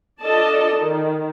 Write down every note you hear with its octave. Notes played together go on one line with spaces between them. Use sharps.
D4 F4 A4 D5 D#5 A5
D#3